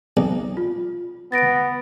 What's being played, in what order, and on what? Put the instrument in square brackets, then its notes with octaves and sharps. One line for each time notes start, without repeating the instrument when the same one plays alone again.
[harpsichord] B1
[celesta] F4
[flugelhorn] B3 [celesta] A6 A#6 D7